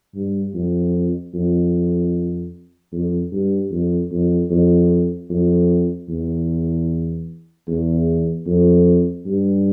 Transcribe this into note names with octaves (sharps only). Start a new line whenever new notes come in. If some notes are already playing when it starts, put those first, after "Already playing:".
G2
F2
F2
F2
G2
F2
F2
F2
F2
E2
E2
F2
G2